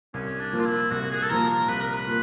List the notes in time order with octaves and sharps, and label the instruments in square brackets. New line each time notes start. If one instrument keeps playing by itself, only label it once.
[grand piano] C2 [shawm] C#4
[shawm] D4
[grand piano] A#2 F3 A#3
[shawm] F4
E4
[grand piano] C2 [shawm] F#4
[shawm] G#4
A4
[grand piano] A#2 F3 A#3 [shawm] A#4
[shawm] A#4
[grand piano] C2 [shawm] B4
[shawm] A#4
B4
[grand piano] A#2